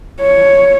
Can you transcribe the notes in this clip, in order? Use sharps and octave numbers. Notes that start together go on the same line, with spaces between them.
C#5